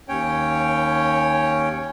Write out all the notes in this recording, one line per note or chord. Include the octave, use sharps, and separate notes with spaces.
D#2 C#4 C#5 G5